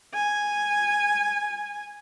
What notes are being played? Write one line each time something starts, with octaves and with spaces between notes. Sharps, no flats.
G#5